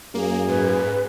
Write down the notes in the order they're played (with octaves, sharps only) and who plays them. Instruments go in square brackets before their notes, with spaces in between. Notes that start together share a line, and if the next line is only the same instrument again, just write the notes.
[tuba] F#2 [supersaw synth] A#3 [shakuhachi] G#4
[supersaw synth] G#2 [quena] B4